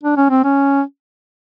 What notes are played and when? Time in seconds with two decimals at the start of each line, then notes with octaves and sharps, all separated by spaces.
0.03 D4
0.17 C#4
0.30 C4
0.44 C#4